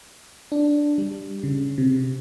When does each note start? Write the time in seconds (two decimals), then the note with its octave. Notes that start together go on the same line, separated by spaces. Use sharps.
0.52 D4
0.98 G3
1.43 C#3
1.78 C3